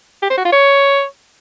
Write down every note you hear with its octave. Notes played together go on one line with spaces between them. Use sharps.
G4
C5
F#4
F4
C#5